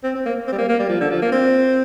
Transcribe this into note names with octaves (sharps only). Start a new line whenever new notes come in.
C4
C4
A#3
C4
G3
A#3
A#3
G3
F3
D3
F3
A#3
C4